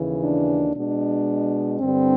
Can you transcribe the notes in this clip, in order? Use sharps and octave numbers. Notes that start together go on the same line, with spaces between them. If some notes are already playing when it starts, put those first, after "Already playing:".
Already playing: D#2 C#3 E3
D4
B2 G#3 D4
G2 D3 G3 C4